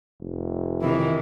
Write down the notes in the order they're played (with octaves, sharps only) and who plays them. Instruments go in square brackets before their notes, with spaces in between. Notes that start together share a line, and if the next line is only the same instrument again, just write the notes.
[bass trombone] F1
[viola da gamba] C3 D#3 E3 [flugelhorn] E4